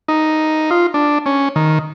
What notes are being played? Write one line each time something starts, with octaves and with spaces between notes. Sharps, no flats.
D#4
F4
D4
C#4
D#3